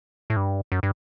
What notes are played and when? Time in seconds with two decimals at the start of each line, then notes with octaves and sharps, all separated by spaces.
0.30 A2
0.36 G2
0.72 F#2
0.83 G2